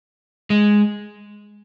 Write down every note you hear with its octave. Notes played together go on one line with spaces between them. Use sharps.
G#3